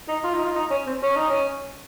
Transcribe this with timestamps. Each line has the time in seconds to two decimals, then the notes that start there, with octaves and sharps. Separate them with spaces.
0.08 D#4
0.24 F4
0.34 D#4
0.44 F4
0.55 D#4
0.71 C#4
0.87 C4
1.03 C#4
1.16 D#4
1.30 C#4